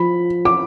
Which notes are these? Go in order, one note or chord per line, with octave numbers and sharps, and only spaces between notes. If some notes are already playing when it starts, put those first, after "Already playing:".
Already playing: F3 B5
D6